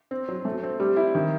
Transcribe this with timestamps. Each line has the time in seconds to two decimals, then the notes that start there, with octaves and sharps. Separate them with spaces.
0.11 C4
0.29 F#3
0.45 A3
0.63 C4
0.80 G3
0.97 E4
1.15 D#3